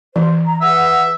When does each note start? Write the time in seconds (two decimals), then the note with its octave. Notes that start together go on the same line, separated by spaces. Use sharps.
0.16 E3 C5
0.46 A#5
0.61 G#4 B4 E5 F#5